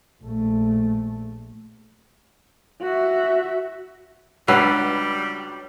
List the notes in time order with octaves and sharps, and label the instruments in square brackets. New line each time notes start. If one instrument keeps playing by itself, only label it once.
[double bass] A#1 A3
[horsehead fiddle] F#4 E5
[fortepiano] C#2 D4 E6 [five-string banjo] F#3 [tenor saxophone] G3 [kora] B4